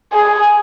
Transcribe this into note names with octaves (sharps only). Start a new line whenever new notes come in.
G#4